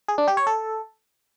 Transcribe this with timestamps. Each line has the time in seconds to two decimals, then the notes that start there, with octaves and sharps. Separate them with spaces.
0.08 G#4
0.18 D4
0.28 G4
0.37 C#5
0.47 A4